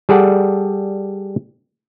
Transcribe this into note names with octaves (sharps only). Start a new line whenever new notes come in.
G3 G#4 A4 D5 F#5 A5